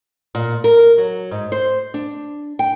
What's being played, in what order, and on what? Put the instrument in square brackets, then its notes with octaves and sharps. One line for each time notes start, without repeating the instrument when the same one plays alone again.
[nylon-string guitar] A#2
A#4
F#3
G#2
C5
D4
G5